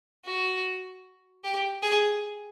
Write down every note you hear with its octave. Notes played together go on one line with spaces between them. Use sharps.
F#4
G4
G#4